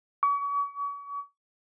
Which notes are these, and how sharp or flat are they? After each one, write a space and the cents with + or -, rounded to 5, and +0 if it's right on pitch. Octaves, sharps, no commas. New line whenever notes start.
C#6 +40